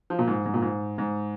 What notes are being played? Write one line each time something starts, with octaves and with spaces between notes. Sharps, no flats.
F3
A#2
G#2
G#2
A#2
G#2
G#2